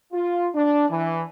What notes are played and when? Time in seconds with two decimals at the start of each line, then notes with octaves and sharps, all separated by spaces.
0.13 F4
0.55 D4
0.90 E3